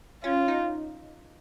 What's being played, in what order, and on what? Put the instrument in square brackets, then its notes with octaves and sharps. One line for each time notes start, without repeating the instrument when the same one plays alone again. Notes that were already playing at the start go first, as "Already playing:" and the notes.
[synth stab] C#4 [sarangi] F4
[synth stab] D#4